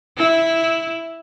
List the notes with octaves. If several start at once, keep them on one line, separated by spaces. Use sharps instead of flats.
E4